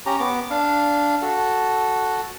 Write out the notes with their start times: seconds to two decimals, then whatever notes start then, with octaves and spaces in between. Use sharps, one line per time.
0.06 C#4 G4 A#5
0.20 B3 D6
0.50 D4 F5
1.22 F#4 A4